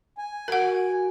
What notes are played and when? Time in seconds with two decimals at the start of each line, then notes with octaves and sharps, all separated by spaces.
0.18 G#5
0.48 F#4 A#4 F#5